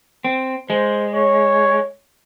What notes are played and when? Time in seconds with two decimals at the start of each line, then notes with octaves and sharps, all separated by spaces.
0.25 C4
0.70 G#3 C5
1.13 C#5